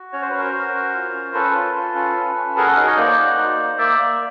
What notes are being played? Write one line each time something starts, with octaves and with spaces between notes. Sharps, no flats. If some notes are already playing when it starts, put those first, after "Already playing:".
Already playing: F#4
C#4 C#5
C5
C#4 B4
A#4 C5
F#4
C#4
F4
C#4
C#4 A4 B4
F4
F4
C#4
C#4
C#4
F#4 G#4 A#4
A4
D#4 G#4 A#4
C#5 D#5
A#3 C5 D5
F#4
D#4
A#3
A#3 D5 E5
A#3